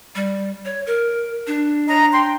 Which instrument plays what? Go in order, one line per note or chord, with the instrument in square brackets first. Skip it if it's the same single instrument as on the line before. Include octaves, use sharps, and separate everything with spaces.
[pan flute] G3
C#5
A#4
D4
[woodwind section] C#5 D#5 A#5
G5 C6